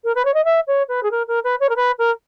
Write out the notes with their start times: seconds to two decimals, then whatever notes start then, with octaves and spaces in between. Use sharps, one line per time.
0.04 A#4
0.15 B4
0.25 C#5
0.34 D#5
0.44 E5
0.67 C#5
0.88 B4
1.03 G#4
1.11 A#4
1.27 A#4
1.44 B4
1.60 C#5
1.69 A#4
1.76 B4
1.98 A#4